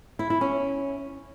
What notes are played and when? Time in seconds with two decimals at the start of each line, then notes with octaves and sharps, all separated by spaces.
0.19 E4
0.30 E4
0.41 C#4